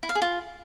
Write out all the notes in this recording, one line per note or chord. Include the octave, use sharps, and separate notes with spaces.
E4
F5
G#4
F4